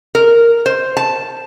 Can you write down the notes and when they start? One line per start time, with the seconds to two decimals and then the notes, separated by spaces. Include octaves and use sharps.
0.15 A#4
0.66 C5
0.97 A5